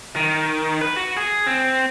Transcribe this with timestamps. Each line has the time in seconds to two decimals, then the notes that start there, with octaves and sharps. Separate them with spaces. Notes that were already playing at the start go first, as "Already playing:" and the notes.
0.16 D#3
0.81 B4
0.96 F#4
1.17 G#4
1.46 C4